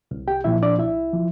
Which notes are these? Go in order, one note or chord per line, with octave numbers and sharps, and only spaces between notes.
C2
G4 G5
A#2 F3 E4 E5
D4 D5
C2 E4 E5
F3